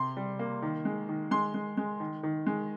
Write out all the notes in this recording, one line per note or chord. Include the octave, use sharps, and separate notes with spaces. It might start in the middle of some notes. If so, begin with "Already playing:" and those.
Already playing: C3 C6
G3
A#3
D#3
G#3
D#3
G#3 C6
G#3
G#3
D#3
D#3
G#3